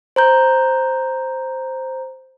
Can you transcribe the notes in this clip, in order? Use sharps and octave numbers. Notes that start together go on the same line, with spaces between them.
C5 A#5 G6